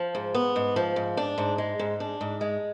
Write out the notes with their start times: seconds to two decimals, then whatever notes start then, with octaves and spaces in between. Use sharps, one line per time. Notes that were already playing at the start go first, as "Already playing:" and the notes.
Already playing: F3
0.15 G#2
0.34 B3
0.56 G#2
0.76 F3
0.96 G#2
1.17 D4
1.38 G#2
1.58 G#3
1.79 G#2
2.00 D4
2.21 G#2
2.41 G#3